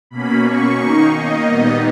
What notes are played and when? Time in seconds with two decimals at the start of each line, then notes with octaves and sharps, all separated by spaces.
0.11 B2 A#3 C#4 B5
0.44 C#6
0.79 D#3 A#3 D#4
1.13 D#5
1.46 A#2 G3 B3 D#4